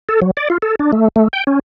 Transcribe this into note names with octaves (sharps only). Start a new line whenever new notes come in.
A4
F#3
D5
F4
A4
D4
A3
A3
G5
C#4